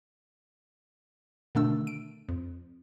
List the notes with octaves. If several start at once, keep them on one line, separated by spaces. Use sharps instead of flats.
B2 D3 D#3 A3 D4 E6
D7
F2